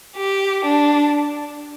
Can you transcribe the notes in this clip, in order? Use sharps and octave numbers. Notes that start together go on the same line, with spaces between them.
G4
D4